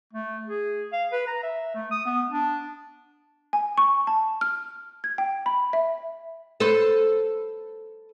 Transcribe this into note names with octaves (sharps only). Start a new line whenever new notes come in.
A3
G#4
F5
B4
A#5
E5
A3
D#6
B3
D4
G#5
C#6
A5
F6
G#6
G5
B5
E5
A4 B4 C5